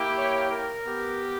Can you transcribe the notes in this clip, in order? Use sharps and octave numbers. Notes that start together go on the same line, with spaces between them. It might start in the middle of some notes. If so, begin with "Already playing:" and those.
Already playing: A#3 E4 G4
C#5
A#4
B3 G4